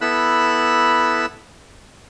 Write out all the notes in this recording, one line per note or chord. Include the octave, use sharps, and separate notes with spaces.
B3 E4 A4 B5 E6 F#6